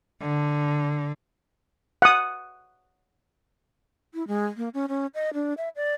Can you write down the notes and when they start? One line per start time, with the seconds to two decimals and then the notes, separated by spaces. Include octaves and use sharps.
0.20 D3
2.02 F#5 D#6
4.14 E4
4.28 G#3
4.57 A#3
4.74 C#4
4.89 C#4
5.14 D#5
5.34 D4
5.57 E5
5.76 D5